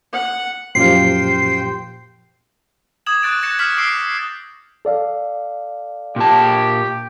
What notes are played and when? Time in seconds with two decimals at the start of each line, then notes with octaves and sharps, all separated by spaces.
0.13 F#5
0.75 F#2 A#2 F3 G4 C5 F5 G5 C7
3.06 D6 D#6 G#6 E7 F#7
3.23 C#6 D#6 F#6 A6 D7 E7
3.42 F#6 G6 A6 A#6 C#7 E7
3.59 C#6 F6 F#6 B6 E7 F#7
3.78 D6 E6 C7 D7 E7
4.85 A4 D5 F5
6.16 A#2 G4 A5